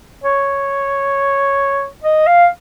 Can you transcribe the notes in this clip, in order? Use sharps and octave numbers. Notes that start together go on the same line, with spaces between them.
C#5
D#5
F5